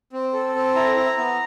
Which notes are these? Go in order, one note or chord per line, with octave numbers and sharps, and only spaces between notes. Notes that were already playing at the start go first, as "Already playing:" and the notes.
C4
A4
C4
E4 A#5
E4
B3